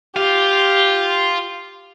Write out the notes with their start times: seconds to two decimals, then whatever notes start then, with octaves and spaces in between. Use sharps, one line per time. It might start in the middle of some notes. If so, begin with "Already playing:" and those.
0.16 F4 G4